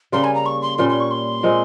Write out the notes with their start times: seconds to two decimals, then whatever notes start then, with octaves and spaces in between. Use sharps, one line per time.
0.12 C#3 G3 A#3 C6
0.24 G#5
0.35 A#5
0.46 C#6
0.62 C6
0.78 A#2 G3 C#4 C6
0.89 C6
1.00 C#6
1.11 C6
1.43 A#2 G#3 C4